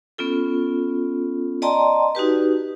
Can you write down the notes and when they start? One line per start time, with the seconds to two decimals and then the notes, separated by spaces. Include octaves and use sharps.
0.18 B3 C#4 F4 A4
1.62 D5 D#5 G5 A5 A#5 C6
2.15 D#4 F#4 G4 B4